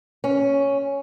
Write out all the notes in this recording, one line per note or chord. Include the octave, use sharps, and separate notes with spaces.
C#4